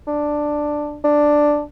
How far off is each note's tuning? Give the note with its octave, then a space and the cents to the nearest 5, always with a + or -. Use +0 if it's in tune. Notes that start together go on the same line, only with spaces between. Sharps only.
D4 +10
D4 +5